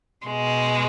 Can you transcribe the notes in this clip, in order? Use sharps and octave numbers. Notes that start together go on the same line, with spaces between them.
B2 G#3